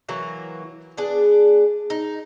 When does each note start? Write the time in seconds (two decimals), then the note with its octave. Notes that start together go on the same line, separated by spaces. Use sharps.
0.09 E3 F#3 A#3
0.97 B3 D4 G#4
1.90 D#4